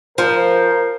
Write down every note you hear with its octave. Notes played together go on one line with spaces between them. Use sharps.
F3 F4 A#4 C5